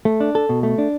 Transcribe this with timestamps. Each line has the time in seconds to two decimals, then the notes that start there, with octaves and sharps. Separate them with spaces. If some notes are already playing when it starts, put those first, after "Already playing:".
0.05 A3
0.20 D4
0.35 A4
0.49 B2
0.63 A3
0.78 D4